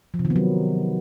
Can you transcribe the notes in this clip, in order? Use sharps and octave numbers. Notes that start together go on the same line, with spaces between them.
F3
C3
D#3
B3
F#3